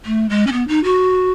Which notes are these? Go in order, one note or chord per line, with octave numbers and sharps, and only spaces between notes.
A3
G#3
C#4
B3
D#4
F#4